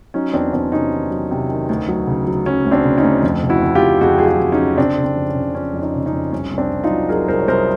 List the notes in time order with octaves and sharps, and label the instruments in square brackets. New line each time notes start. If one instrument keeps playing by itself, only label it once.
[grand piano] F#3 C#4 D#4
E2 C4 D4
E2 C4 D4
C3 C#4 D#4
D#3
F#3
C3
D#3
D2
F#3
C#3
F#3
F#3 C#4
D2
C4 D4
C#3
C#4 D#4
D2
F2
C#3
E4 F#4
F2
F4 G4
F2
F2 F#4 G#4
F#3 G#4
F4 G4
F2
C#4 D#4
F2
C#3 C4 D4
C#3
C4
F2
C#4
C#3
F3 C#4
F2
C#4 D#4
C#3
C#4 D#4
F2
C2 C#4
C2
C4 D4
C2
D#4 F4
F#3
F#3 G#4 A#4
C2 A#4 C5
C#5
C2 A#4 C5